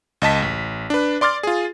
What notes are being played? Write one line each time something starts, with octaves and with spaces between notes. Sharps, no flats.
C#2 D#5 A5 B6
A1
D4 B4
D5 C6 D6 F6 A6
F4 G#4